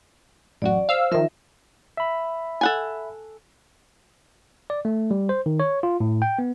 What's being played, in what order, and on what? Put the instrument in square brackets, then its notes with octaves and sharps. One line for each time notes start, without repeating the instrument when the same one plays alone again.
[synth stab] A1 F#2 F#4 [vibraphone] D5
[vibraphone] C5 [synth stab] F5 E6
[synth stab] D#3 F3 [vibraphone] A#4 E5
[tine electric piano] E5 B5
[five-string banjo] A4 F#5 G#5
[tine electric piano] D5
A3
G3
C5
D#3
C#5
F4
A2
G5
B3